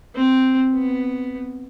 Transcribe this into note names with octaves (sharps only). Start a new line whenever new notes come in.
C4
B3